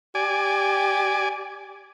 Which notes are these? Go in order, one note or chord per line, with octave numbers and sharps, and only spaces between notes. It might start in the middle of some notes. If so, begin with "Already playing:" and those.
G4 D5 G#5